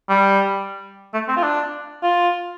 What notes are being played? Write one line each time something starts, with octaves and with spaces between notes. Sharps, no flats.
G3
A3
C4
F4
D4
F4